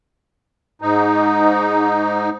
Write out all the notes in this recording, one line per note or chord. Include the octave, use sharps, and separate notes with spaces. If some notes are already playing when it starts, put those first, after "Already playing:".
G#2 D#4